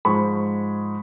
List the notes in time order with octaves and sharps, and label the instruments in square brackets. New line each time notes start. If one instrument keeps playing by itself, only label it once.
[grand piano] G#2 F3 G#3 B5 C#6